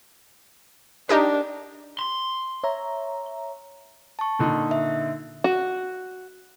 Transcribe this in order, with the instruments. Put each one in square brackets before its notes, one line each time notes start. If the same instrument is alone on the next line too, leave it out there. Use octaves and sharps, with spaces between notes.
[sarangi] D4 [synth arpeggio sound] D#4 G4 A#4
[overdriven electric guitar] C6
[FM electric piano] C#5 E5 A#5
[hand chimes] A5 C#6
[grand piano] A#2 D3 D#4
[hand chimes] E5
[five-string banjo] F#4